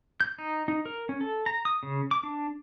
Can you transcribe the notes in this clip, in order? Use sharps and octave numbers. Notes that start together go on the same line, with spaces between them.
G6
D#4
D#4
A#4
C#4
A4
A#5
D#6
C#3
D6
D4